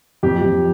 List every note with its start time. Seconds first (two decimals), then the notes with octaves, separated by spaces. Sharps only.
0.23 F2 G4
0.42 F2